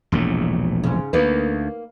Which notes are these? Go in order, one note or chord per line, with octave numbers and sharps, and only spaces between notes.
E1 A#1 A2
G#2 C#3
D2 A#3 D#4 B4